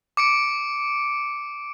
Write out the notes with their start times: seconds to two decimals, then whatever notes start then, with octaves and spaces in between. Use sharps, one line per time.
0.17 D6 C#7 D7